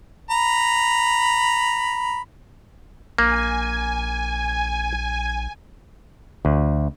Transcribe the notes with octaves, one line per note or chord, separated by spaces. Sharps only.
A#5 B5
A#1 A#3 G#5
D2